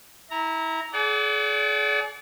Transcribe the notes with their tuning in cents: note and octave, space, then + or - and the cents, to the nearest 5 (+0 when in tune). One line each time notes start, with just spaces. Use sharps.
E4 -25 A#5 +0
G#4 +40 D5 -30 F#5 +30